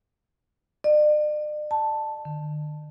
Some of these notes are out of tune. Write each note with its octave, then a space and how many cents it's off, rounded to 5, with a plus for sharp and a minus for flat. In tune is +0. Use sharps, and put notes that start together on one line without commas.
D5 +45
A5 +0
D3 +40